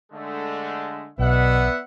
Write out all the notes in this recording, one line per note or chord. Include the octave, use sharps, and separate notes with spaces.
D3 G#3 A3
B1 B2 B3 D5 E5 F#5